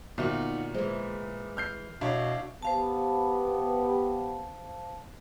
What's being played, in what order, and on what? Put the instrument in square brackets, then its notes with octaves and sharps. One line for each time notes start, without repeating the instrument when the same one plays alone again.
[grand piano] A#2 [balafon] D3 B3 E5 [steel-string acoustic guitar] D#4 F4 F#4
[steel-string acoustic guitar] E3 G#3 [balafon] C5
[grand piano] F6 G6 C7
[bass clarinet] B2 [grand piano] D4 E4 C#5 [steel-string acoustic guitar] F5
[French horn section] B3 G4 [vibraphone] C5 F5 A5